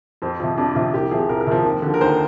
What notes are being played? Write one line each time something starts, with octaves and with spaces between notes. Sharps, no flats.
F2 C4
C3 F3
F2 D4
C3 F3 F4
C2 G4
C3 F3 G#4
C2 A#4
A#4
C3 F3
D#2
D3 F3
A#4
D#2 C5